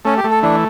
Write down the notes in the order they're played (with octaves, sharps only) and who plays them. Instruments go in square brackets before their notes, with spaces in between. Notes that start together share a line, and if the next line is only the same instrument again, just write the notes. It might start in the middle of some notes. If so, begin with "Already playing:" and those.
[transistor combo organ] A3 [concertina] C#4
[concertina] G4
[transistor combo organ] A3
[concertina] A4
[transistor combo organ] E3 [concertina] D4